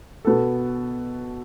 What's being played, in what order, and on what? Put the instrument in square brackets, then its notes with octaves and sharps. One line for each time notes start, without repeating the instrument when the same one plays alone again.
[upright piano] B2 B3 A4